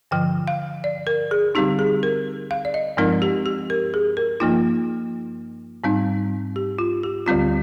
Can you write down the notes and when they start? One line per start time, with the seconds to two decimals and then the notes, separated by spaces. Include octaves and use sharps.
0.11 G2 D3 F3 G5
0.48 F5
0.84 D5
1.07 A#4
1.31 G#4
1.55 D3 G3 C4 D#4 G4
1.79 G#4
2.03 A#4
2.51 F5
2.65 D5
2.74 D#5
2.97 G2 F3 G#3 C4 D#4 A#4
3.22 G4
3.46 G4
3.70 A#4
3.94 G#4
4.17 A#4
4.40 G2 F3 A#3 D#4 F4
5.84 G#2 G3 C4 D#4
6.56 G4
6.79 F4
7.03 G4
7.26 D2 D3 G3 C4 F4